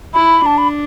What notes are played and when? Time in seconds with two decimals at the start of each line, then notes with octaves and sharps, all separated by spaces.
0.14 E4 B5
0.46 D4 A5
0.58 B5